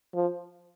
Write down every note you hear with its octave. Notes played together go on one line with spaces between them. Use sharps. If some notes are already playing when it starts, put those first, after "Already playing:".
F3